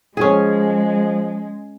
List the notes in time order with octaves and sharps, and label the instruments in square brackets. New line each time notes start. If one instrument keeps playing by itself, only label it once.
[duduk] F3 [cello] G#3 [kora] C#4 G#4